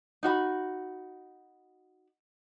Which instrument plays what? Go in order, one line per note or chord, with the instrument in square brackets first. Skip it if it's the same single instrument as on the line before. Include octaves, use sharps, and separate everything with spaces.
[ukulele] D#4 F#4 B5